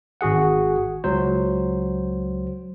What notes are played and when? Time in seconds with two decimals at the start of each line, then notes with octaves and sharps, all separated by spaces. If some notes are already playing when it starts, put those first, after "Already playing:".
0.21 G#1 F#4 G#4 F#5
1.04 C#2 F#3 C5